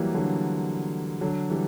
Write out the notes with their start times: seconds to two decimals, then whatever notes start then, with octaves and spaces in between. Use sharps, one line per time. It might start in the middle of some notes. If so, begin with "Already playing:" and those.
Already playing: E3 F#3 G3 A#3
0.14 D3 F#3
1.21 D3 F#3
1.50 E3 G3